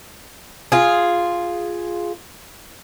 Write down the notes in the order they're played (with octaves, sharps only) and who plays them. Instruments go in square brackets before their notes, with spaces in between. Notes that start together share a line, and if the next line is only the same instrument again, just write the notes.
[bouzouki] F4 G#4